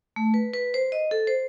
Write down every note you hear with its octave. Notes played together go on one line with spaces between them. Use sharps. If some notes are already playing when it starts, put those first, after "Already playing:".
A3
B4
B4
C5
D#5
A4
C5